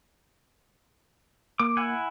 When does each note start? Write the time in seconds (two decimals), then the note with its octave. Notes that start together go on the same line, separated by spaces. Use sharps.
1.60 A#3 D6
1.77 E4 F#5 G#5